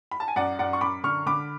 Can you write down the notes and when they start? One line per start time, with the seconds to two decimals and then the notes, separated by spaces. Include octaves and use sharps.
0.11 B5
0.20 A5
0.28 G#5
0.36 F#2 D5 F#5
0.59 F#2 D5 F#5
0.73 C#6
0.81 F#2 B5 D6
1.04 D3 C#6 F6
1.26 D3 B5 D6